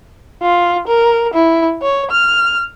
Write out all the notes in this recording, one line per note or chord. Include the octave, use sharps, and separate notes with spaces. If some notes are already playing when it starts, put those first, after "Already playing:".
F4
A#4
E4
C#5
F6